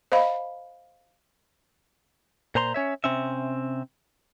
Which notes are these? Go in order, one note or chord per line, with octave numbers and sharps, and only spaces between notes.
C5 D#5 F5 B5
A#2 C5 A#5 C6
C#4 C#5 E5
C3 C4 C#4 E5